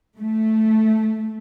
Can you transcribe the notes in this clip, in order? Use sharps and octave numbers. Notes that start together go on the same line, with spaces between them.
A3